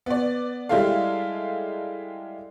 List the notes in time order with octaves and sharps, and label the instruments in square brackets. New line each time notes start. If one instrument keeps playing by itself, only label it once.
[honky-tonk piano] B3 D5
G3 G#3 E4 G4 A4 F5